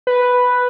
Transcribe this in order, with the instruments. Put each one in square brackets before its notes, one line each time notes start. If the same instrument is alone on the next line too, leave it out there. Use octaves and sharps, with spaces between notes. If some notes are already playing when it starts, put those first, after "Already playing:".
[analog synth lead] B4